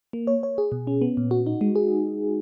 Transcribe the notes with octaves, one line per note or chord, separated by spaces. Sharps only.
A#3
C#5
C#5
G#4
B2
C#4
B3
A#2
F#4
D#4
G#3
G#4